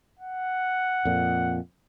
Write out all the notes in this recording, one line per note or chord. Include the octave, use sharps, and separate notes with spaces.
F#5
F2 A#2